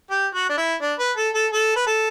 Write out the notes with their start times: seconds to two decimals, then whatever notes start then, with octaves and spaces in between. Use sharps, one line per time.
0.11 G4
0.34 F#4
0.50 D4
0.58 E4
0.82 D4
0.99 B4
1.17 A4
1.34 A4
1.52 A4
1.76 B4
1.87 A4